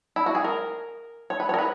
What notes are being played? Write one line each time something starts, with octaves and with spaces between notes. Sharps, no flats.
E4
F#4
G#4
A#4
C#5
B4
C#5
A#4
B4